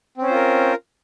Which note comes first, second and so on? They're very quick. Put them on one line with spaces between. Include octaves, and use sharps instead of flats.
C4 C#4 C5 F4 A#4